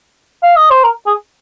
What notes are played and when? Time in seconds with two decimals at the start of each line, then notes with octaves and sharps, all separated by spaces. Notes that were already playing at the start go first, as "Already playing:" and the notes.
0.43 F5
0.57 D#5
0.71 C5
0.84 A#4
1.06 G#4